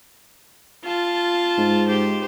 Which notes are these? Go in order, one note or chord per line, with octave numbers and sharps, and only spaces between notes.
F4 A5
G#2
G4 C5